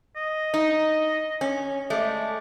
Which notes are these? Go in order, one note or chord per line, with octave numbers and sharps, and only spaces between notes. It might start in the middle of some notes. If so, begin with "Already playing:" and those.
D#5
D#4
C#4
G#3 A3 D5